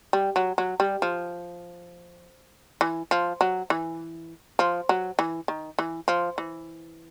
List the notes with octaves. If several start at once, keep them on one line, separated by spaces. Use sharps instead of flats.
G3
F#3
F#3
G3
F3
E3
F3
F#3
E3
F3
F#3
E3
D#3
E3
F3
E3